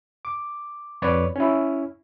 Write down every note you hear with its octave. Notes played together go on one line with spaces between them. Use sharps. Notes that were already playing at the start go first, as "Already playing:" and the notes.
D6
F2 B4 C#5 D5
C#4 E4